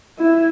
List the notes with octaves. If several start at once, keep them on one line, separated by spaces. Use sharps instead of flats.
E4